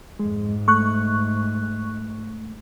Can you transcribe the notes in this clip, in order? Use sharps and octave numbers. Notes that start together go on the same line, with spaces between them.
F2 G#2 G#3
A3 C#6 F#6